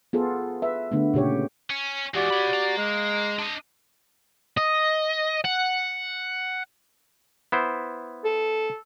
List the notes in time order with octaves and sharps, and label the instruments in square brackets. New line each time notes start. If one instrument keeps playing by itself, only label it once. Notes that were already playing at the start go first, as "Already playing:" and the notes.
[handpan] B3 F4 G#4 A4
B4 E5
D3 A3 B3
A#2 C#3 G4 C#5
[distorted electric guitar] C#4
[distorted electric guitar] E3 G#3 [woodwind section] F#4 G4 D5
[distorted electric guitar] C#5 B5
F5 A#5
[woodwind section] G#3
[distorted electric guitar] D4 D#5
D#5
F#5
[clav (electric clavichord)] B3 E4 C5
[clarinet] A4